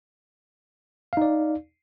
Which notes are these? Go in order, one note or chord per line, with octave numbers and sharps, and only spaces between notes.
D#4 D5 F5